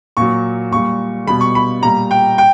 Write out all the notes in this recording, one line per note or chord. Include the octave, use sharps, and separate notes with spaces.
A#2 F#3 C#6
A#2 G3 C#6
B2 G3 B5
C#6
B5
A#2 G3 A#5
G5
G5